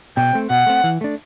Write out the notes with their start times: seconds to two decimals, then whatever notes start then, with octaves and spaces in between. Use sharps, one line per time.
0.17 B2 G5
0.33 A3 C4
0.50 B2 F#5
0.67 A3 C4
0.84 E3
1.01 A3 D4